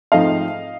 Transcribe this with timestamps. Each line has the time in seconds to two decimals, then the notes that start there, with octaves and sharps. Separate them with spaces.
0.12 G#2 F3 A3 C4 D#4 D#5 F5